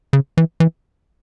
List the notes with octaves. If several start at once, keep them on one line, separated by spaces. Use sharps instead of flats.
C#3
E3
E3